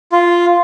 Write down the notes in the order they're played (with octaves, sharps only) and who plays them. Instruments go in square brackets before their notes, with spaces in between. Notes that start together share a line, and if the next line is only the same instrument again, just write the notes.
[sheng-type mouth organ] F4